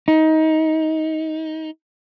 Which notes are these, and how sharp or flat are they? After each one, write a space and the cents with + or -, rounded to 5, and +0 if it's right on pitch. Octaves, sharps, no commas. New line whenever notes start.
D#4 +25